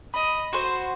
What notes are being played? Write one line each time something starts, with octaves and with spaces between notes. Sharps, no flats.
D#5 B5
F#4 C5 C6